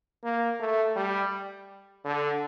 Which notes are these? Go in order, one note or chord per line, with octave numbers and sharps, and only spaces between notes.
A#3
A3
G3
D3